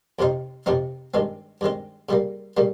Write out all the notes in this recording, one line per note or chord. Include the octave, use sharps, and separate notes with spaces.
F2 C3 F3 C4 D#4
F2 C3 F3 C4 D#4
G2 D#3 G#3 C4
G2 D#3 G#3 C4
C#3 G3 A#3
C#3 G3 A#3